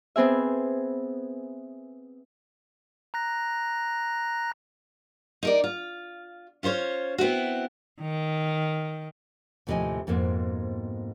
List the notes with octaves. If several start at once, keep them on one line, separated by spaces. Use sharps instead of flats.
B3 C4 G#4 E5
A#5 F#6 A#6
D#4 A#4 D5
F4
C#4 F4 C5 C#5
B3 C4 E4 F#4
D#3
D#2 A2 C3 F3 D#5 G#5
F2 G#2 B2 A#3 C4